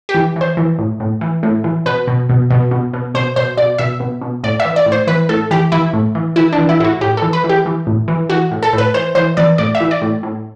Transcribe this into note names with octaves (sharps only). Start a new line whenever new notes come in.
G4
E3
E3 C5
E3
A2
A2
E3
A2
E3
B2 B4
B2
B2
B2
B2
B2
B2 C5
B2 C5
B2 D5
B2 E5
B2
B2
A2 D5
E5
E3
D5
A2
C5
E3 B4
A2 A4
E3 G4
E3 E4
A2
E3
E3 E4
D4
E3
E4
A2 E4 F#4
A2 G4
E3 A4
B4
E3
G4
E3
A2
E3
E3 F#4
A2
A4
A2
B4
E3 C5
E3 C5
E3 D5
A2 D5
E5
E3
D5
A2
A2